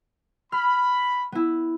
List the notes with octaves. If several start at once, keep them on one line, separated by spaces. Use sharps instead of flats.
B5 F6
B3 E4